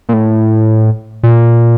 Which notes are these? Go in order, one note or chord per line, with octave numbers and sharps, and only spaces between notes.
A#2
A2
A#2